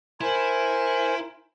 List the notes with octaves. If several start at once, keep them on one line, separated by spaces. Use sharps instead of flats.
E4 A#4 C5 G#5